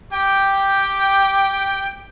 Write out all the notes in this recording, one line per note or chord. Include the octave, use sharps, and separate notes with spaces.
G4 G5